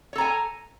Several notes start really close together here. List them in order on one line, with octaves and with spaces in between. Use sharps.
C#5 A4 A#5 G#5